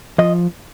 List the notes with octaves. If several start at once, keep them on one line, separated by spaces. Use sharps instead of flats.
F3 D#5